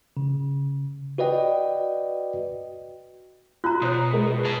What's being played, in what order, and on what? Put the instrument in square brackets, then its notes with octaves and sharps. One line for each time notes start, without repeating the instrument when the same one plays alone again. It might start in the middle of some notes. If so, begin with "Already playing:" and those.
[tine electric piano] C#3
F#4 B4 D5 D#5 G5
[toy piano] F4 F#4 A#5 [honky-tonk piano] F#6
[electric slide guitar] B2 [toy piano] C5 C#5 D#6
[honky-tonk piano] G#3 B4
[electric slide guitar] G#4 A#5 [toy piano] A5